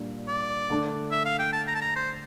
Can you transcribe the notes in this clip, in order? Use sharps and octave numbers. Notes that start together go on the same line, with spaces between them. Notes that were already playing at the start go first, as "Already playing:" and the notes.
Already playing: A#2 G3 A#3 D4
D5
D3 A3 D4
E5
F5
G5
A5
A#5
A5
A#5
C5